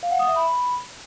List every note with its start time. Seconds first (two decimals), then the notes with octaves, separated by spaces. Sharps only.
0.03 F5
0.11 F#5
0.19 D#6
0.28 E5
0.36 B5